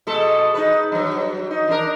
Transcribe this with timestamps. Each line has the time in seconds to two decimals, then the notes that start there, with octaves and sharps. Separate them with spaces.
0.07 B2 G#3 A4
0.54 D#4 B4
0.92 G2 F#3
1.51 D#4
1.68 E3 D4 A#4